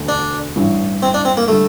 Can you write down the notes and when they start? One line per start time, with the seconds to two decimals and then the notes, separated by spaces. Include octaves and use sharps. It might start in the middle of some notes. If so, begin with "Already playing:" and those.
Already playing: E1 D2 D3 A3
0.09 D4
0.56 A1 G2 E3
1.02 C4
1.14 D4
1.25 C4
1.37 A#3
1.48 D3 G3 A3